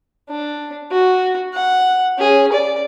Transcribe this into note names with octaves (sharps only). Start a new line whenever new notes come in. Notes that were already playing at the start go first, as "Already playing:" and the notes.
D4
F#4
F#5
C#4 G#4
D5